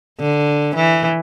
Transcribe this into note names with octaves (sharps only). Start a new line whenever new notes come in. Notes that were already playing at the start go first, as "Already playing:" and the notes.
D3
E3